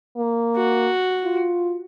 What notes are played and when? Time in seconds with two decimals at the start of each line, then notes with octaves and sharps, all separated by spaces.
0.17 A#3
0.56 F#4
1.24 F4